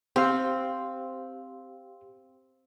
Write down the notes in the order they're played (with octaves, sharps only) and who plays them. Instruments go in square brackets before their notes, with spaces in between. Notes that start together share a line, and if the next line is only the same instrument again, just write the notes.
[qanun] C4 [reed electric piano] G4 F5